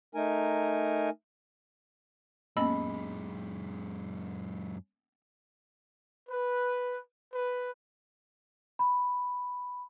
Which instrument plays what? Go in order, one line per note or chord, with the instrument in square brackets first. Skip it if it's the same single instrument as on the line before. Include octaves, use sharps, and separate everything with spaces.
[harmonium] A3 D#4 A#4 G#5
[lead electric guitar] F#2 G#3 [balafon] A#3 B3 C#4 [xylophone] D#5 B5 E6
[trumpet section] B4
B4
[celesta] B5